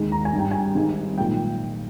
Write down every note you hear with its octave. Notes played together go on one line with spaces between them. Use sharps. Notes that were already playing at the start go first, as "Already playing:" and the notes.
Already playing: D#2 D#3 G#3
A#5
G#5
G#1 G2 G3
G5
G#5
G#1 G#2 G3
B1 A#2 G#3 G5